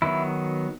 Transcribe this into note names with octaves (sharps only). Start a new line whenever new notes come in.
D#3 F#3 B3 E4